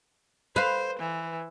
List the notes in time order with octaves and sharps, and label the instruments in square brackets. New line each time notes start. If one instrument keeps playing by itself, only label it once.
[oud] B4 F5 [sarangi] C5
[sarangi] E3